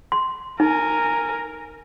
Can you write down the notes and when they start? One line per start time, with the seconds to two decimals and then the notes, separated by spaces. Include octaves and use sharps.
0.12 C6
0.60 D#4 A#4 G#5